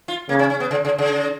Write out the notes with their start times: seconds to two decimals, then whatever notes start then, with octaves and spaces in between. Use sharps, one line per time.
0.08 F4
0.29 C#3 A#3
0.39 C#4
0.50 C#4
0.60 B3
0.71 C#3
0.85 C#3
0.98 C#3